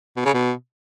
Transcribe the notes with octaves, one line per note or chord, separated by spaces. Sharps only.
B2
C#3
B2